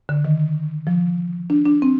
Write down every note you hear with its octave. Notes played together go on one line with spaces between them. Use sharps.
D3
D#3
F3
D4
D4
C4